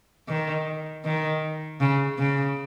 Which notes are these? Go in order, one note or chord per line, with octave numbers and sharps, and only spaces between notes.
D#3
D#3
C#3
C#3